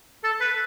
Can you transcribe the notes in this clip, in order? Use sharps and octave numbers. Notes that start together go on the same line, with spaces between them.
A4
B4